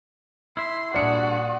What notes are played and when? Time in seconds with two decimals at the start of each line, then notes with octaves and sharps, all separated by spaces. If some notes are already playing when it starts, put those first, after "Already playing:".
0.57 E4 E5 C6
0.94 A#2 G3 D4 F#4 G#4 D5 C#7